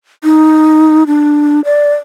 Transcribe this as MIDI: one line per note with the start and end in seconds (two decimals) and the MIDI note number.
0.24 1.04 63
1.07 1.61 62
1.65 1.93 74